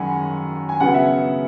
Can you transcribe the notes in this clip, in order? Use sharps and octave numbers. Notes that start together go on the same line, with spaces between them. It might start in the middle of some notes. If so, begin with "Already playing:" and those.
Already playing: F#2 D#3 G#3 C#4 F#5 G#5 B5
G#5
C#3 F#3 B3 F#5
E5